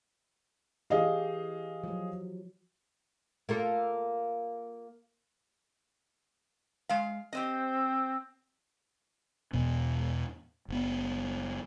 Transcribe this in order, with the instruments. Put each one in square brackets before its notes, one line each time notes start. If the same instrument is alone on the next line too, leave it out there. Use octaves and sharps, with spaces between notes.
[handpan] E3 G4 [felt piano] G#4 D#5 F5
[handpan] F3 F#3
[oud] A#3 F4 A4
[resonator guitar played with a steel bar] G#3 F5
[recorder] C4 [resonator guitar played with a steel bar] G4 C5 D#5
[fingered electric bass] E2 B2 B3
F#1 B3